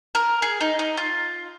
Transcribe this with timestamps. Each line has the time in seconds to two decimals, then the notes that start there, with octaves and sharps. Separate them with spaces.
0.15 A#4
0.42 G#4
0.61 D#4
0.79 D#4
0.97 F4